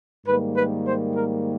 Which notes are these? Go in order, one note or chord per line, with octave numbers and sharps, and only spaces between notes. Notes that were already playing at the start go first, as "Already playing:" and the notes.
G#2 D#3 G3 A#3 B4
B4
C5
A#4